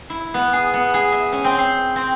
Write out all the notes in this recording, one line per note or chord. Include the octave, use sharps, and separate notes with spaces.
E4
B3
G#4
B3
G#4
E5
C#4
C4
C5
C4